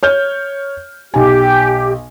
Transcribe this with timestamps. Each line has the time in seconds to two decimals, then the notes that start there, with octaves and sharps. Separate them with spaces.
0.03 C#5 F6 G6
1.14 B1 G4 G#5